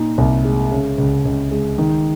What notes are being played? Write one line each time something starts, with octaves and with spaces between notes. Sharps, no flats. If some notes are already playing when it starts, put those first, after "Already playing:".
Already playing: A#2 D#4
C2
G#3
C#3
C#2
C#2
G#3
D#3